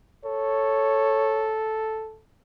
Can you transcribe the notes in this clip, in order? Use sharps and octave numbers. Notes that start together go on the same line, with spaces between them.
A4 C#5